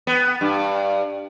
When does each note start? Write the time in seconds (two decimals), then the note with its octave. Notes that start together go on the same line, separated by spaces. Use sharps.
0.07 B3
0.41 G2